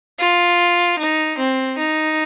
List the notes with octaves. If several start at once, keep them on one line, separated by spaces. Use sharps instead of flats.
F4
D#4
C4
D#4